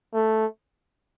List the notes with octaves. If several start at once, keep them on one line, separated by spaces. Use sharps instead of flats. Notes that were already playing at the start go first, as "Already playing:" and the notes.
A3